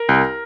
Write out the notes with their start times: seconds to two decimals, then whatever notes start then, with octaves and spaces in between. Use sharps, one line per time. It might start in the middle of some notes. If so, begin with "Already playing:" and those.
Already playing: A#4
0.09 C2